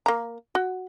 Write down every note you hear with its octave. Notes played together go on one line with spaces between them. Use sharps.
A#3 A#5
F#4